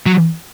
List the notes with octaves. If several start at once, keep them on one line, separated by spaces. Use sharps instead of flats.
F#3